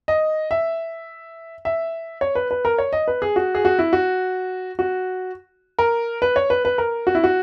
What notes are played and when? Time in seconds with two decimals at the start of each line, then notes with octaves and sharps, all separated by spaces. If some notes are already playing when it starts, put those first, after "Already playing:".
0.08 D#5
0.51 E5
1.65 E5
2.21 C#5
2.35 B4
2.51 B4
2.65 A#4
2.78 C#5
2.93 D#5
3.08 B4
3.22 G#4
3.36 F#4
3.55 G#4
3.65 F#4
3.79 E4
3.93 F#4
4.79 F#4
5.79 A#4
6.22 B4
6.36 C#5
6.50 B4
6.65 B4
6.78 A#4
7.07 F#4
7.15 E4
7.24 F#4